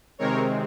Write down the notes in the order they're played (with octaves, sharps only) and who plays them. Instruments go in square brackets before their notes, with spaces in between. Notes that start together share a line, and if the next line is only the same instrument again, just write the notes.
[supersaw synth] C3 D#3 G#3 C4 A#4 C#5